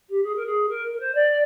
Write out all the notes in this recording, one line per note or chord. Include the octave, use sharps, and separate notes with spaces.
G4
G#4
A#4
G#4
A#4
A#4
C5
D5